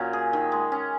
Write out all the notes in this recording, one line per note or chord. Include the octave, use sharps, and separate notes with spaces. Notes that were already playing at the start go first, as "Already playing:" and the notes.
Already playing: A#2 F#3 C#4
G#4
D#3
G#3
C#4